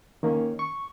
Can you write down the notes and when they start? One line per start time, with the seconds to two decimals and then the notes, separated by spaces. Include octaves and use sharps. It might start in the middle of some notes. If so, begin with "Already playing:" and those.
0.23 D#3 A#3 C#4
0.59 C#6